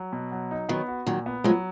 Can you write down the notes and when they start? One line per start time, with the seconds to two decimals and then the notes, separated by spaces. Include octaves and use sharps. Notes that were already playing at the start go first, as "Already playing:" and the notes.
Already playing: F#3
0.13 B2
0.32 F#3
0.51 D#4
0.69 D#3 F#3 B3
0.88 F#4
1.07 A#2 D#3 F#3
1.26 B3
1.44 F3 F#3 G#3